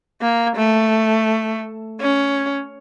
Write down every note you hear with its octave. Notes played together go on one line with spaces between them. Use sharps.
A#3
A3
C#4